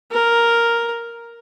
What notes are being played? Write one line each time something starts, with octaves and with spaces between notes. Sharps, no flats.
A#4